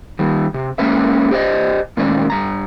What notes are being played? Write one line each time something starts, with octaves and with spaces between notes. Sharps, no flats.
D#3 G3
C3
G#3 A#3 C#4 B4 E5
G4 C5 D5 D#5
A#2 D#3 G#3 C#4 D5
G2 A#5